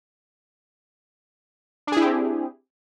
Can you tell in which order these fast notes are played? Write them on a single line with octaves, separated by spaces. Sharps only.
D4 G#4 E4 G4 C4